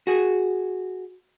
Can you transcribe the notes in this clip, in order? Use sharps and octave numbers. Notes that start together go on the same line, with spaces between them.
F#4 G#4